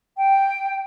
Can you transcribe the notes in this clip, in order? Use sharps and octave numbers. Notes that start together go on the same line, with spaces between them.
G5